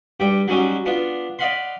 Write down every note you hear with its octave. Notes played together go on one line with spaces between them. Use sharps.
G2 G3 G5
F#3 G3 C#4 D#4 F#4
B3 D4 F4
D5 D#5 F5 F#5 B5 C6